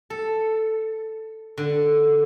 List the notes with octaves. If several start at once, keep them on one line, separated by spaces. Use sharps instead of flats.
A4
D3